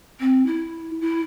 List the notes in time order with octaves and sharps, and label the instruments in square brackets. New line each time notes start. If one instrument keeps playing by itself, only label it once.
[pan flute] C4
E4
E4